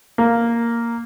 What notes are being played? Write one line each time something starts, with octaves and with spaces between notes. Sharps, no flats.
A#3